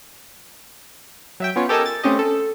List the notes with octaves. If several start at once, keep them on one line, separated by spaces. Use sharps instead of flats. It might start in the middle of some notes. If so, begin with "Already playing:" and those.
F#3 E5 G5
B3 C#4 F4 C#5
G4 A4 A#4 D#5 G#5 A5
A6
A3 C4 C#4 G4 D#5
A4